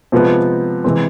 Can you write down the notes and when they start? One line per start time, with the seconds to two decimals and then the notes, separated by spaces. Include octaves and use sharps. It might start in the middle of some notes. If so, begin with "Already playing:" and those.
0.12 C3 F3 G#3 B3
0.84 C3 E3 G#3 C4